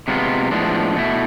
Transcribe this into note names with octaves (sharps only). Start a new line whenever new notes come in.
C3 G#3 B3 D4 F4
A2 F3 G#3 B3 D4
B2 A3 E4